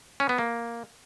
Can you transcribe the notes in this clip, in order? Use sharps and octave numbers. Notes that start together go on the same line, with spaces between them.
C#4
B3
A#3